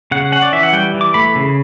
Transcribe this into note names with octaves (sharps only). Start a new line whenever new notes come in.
C#3 F#5
C#4 F#5
D5
E3 E5
F#5
G3 G5
E3
D6
A3 B5
C#3